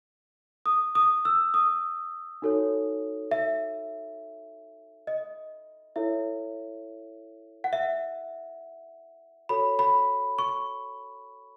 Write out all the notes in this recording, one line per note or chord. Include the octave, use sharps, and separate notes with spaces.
D#6
D#6
E6
D#6
D#4 F#4 A4 C#5
E5
D#5
E4 A4 C#5 E5
F#5
E5
F#4 A4 C#5 B5
B5
C#6